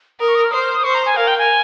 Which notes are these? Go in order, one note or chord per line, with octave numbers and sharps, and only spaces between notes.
A#4 D#6
C#6
D#6
F6
C5 D#6
F6
D#6
C5 C#6
A#5
G#5
A#4 F5
G5
G#5